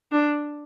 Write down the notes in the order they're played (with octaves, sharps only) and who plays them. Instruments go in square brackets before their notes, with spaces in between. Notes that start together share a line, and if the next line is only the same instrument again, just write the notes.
[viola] D4